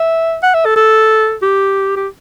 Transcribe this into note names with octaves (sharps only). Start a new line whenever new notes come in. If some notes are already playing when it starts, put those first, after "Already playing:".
Already playing: E5
F#5
E5
A4
A4
G4
G4